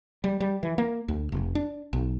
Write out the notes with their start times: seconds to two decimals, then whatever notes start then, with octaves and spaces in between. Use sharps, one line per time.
0.24 G3
0.40 G3
0.63 E3
0.78 A#3
1.08 D2
1.32 F1
1.55 D4
1.93 B1